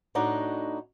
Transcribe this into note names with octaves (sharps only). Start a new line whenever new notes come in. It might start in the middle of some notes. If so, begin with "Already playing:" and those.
A2 D4 D#4 F#4 D#5